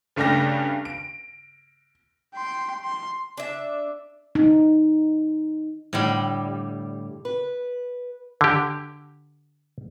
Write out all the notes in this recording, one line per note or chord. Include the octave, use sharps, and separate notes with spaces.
G2 C#3 A3 D4 G5 A#6
D7
G5 C6
C6
D4 E5
D#4
A2 D3 G3
B4
D3 G4